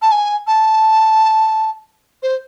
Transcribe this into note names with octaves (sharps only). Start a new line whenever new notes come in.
A5
G#5
A5
C5